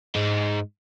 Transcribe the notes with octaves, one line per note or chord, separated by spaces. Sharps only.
G#2 G#3